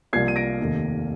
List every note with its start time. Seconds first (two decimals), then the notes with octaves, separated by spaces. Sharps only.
0.13 C2 C3 F3 A#3 G#6 C7
0.28 D#7
0.36 A#6 D7
0.59 F1 D#2 D#3 A#3